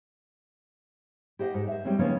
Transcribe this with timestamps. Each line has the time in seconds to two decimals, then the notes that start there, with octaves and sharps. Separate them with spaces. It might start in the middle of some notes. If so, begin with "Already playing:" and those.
1.39 G4 C5 D#5 F#5
1.54 G#2
1.67 C5 E5
1.85 G3 G#3 C4 C#4
1.99 C#3 F3 A#3 B3 C#4 D#4